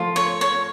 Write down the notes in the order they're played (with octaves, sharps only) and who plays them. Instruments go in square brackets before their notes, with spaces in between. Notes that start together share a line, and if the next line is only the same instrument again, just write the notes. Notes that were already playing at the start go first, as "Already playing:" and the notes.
Already playing: [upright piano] F3 A3 [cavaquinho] F4
[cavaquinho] C#5
C#5